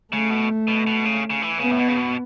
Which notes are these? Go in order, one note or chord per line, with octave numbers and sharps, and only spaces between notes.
C#3 A3
B2
B2
B2
C#3
C#3
E3
C#3 B3
A2
B2
C#3
B2